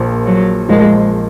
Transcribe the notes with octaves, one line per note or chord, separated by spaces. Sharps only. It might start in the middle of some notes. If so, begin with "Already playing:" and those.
Already playing: A#1 A#2 F3 A#3
F#3
A#1 A#2 F3 G#3 A#3